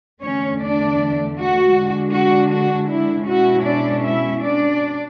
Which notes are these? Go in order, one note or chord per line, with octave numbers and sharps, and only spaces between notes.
E2 D3 A3 C#4 C#5
D4 D5
F#4
D3 G#3 D4
F#4
F#4
E4
B2 G#3 C#4 E4 F#4
D4 D5
E4 E5
D4 D5